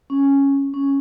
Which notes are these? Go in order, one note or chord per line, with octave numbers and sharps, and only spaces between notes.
C#4
C#4